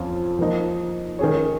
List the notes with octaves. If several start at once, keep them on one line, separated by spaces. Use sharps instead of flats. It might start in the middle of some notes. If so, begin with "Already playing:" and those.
Already playing: F2 F3 C#4 F4
F3 A#3 D#4
D#3 C#4 G#4 C#5